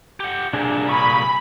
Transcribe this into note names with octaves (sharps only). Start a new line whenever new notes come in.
G4 F#5
C2 A#2 D4 G#4
G#4 B5 C#6